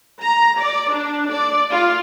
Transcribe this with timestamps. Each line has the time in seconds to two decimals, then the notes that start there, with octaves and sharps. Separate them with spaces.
0.22 A#5
0.59 D5
0.91 D4
1.30 D5
1.72 F4